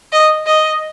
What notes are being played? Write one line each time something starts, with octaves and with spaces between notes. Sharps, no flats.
D#5
D#5